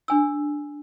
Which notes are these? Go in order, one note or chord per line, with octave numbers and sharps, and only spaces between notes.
D4 G#5 E6